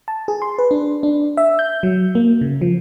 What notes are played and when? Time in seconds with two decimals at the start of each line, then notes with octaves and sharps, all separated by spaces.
0.08 A5
0.28 G#4
0.42 C6
0.58 B4
0.71 D4
1.03 D4
1.37 E5
1.59 G6
1.83 F#3
2.15 A#3
2.41 C#3
2.61 F3